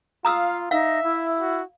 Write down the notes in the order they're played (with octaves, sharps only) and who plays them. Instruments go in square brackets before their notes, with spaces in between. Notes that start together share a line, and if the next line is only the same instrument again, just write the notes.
[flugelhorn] F4 [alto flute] F5 [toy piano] A#5 D#6 E6
[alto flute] D#4 [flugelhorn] E5 [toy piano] F5
[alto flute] E4
[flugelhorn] F#4